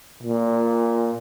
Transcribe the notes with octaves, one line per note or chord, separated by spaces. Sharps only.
A#2